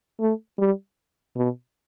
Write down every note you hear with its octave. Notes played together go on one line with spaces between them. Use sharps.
A3
G3
B2